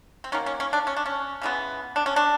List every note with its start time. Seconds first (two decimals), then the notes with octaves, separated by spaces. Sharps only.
0.24 C4
0.32 D#3 F#3 A#3 C#4
0.46 C#4
0.60 C#4
0.73 D4
0.87 C#4
0.97 D4
1.06 C#4
1.42 C#3 E3 G#3 B3
1.96 D4
2.06 C#4
2.16 D4